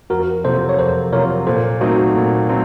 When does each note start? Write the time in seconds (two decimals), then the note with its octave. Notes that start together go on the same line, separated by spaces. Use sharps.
0.10 F2 F#4 A#4
0.44 C3 F#3 A#3 F4 A4 C5
0.69 C#5
0.78 F2 A4 C5
1.12 C3 F#3 A#3 F4 A#4 C#5
1.47 A#2 A4 C5
1.81 F#3 A3 C4 D#4 F#4 A#4
2.15 A#2
2.49 F#3 A3 C4